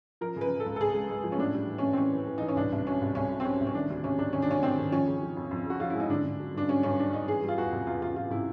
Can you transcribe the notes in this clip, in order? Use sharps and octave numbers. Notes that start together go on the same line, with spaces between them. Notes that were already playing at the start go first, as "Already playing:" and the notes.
F3 A#4
C#3
B4
C#3
A4
C#2
A4
C#3 G#4
G#3
G#3
F3
C#4
A2 D4
G3
E3
A2 C#4
C4
E3 C#4
E3
E3
E3 D#4
C#4
C2 D4
C2
F#3 C#4
C2
C2 C#4
F#3
C4
F#3 C#4
C2
C#4
D#3 D4
D2
C3 C#4
C3 D4
D#3 C#4
D4
D2 C#4
D#3 C4
D#3
F3 C#4
C#3
F3
F2
F2
C#3 F#4
F3 F4
G#3 E4
D#4
D3 D4
D3
F#3
G2 D4
F#3 C#4
G2 C#4
F#3 D4
G2 D#4
E3 G#4
G3
F4
E2 F#4
C3
E2 F4
E2 F4
E2 F4
C3 E4